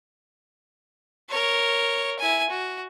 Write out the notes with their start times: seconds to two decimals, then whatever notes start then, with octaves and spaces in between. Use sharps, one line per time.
1.29 A#4 C#5
2.19 E4 G#5
2.50 F#4